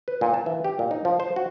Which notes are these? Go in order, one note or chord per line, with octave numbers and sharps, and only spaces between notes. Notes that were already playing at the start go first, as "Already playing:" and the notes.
B4
A#2
A5
E3
G4
A#2
D#4
F3
C5
F#4